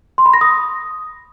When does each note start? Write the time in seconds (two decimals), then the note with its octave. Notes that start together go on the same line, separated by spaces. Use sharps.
0.18 C6
0.26 B5
0.34 A#6
0.41 D#6